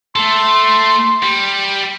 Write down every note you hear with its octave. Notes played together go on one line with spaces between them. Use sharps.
A3 A4 C6
G3